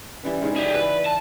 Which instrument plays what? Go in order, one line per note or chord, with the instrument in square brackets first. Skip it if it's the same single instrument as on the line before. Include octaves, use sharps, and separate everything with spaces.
[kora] E3 G3 B4 [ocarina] C#4
[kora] G#2 C#3 E3
[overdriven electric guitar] G4 G#4 [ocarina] D5
[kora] E3 [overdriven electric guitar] B4
[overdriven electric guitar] A5